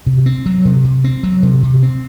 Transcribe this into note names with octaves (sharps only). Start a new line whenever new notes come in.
C3
C4
F#3
C3
C3
C4
F#3
C3
C3
C4